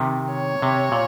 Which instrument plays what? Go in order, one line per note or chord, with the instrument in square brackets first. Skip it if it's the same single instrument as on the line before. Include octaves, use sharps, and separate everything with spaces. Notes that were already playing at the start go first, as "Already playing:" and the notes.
Already playing: [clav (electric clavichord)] C3 D#3
[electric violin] C#5
[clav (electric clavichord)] C3
A#2